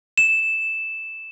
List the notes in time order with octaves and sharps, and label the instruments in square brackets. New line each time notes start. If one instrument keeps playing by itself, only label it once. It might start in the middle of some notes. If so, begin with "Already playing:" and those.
[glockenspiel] E7